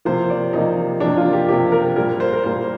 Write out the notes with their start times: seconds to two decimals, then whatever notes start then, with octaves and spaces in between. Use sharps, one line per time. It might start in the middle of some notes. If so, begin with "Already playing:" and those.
0.05 C3 F3 A#3 C5
0.30 D5
0.53 C3 F3 A#3 D#4
1.00 C3 F3 A#3 D4
1.17 F4
1.33 G4
1.49 C3 F3 A#3 G4
1.72 A#4
1.96 A#2 G3 A#3 A#4
2.20 C5
2.33 A#4
2.43 A#2 G3 A#3 C5